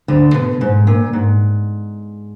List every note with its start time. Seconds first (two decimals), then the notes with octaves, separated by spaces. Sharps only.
0.08 D2 D3
0.34 B2
0.61 G#2
0.87 A#2
1.13 G#2